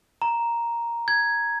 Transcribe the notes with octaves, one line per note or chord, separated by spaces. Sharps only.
A#5
G#6